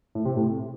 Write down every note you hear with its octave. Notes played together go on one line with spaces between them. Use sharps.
A2
C3
A2